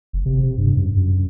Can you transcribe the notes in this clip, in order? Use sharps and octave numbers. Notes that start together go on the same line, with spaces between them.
F#1
C3
C3
G2
F#2
F#2